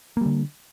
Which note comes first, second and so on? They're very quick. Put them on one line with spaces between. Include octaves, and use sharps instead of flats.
A#3 G3 D3